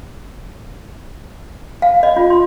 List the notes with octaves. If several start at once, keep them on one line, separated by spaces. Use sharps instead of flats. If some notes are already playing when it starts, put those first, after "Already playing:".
F5
D#5
F4
C6